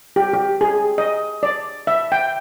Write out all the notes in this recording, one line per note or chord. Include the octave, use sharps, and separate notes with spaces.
G4
G4
G#4
D#5
D5
E5
G5